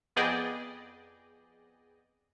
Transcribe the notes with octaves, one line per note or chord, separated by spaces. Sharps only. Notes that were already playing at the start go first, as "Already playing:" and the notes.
F2 B3 G#4 D5 D#5 G5